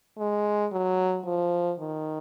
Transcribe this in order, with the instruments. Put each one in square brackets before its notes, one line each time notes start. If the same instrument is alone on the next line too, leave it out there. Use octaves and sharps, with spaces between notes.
[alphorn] G#3
F#3
F3
D#3